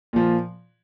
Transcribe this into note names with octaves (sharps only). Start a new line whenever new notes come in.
A#2 F3